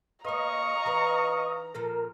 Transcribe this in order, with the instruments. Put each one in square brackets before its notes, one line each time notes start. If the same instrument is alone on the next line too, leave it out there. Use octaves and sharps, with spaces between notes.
[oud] A#3 B4 [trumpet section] C#5 F5 C#6 [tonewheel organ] D#5 [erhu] A#5
[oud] E3 D#4 B4
[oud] A#2 F3 A4 [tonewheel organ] A#4